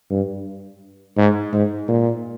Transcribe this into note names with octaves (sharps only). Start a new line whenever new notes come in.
G2
G#2
G#2
A#2